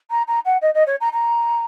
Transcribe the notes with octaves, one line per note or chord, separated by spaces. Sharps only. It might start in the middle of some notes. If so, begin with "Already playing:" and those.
A#5
A#5
F#5
D#5
D#5
C#5
A#5
A#5